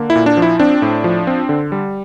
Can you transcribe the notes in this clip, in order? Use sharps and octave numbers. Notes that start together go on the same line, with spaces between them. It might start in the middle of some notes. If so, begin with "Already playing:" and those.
Already playing: D3 A#3
E4
A#2
D4
F3 E4
C4 D4
A2
F3
C4
D3
G3